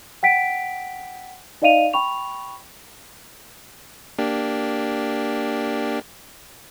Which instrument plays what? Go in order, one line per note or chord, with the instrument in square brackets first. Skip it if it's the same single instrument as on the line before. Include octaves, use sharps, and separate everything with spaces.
[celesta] F#5 G5 B6 D7
D#4 D5 D#5 F5 D#7 F7
G5 B5 C#6 F7
[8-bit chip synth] A#3 D4 G4